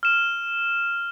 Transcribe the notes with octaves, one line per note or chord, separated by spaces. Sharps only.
F6 E7